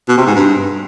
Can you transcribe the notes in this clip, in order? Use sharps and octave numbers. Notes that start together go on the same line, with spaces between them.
B2
C3
G#2
G2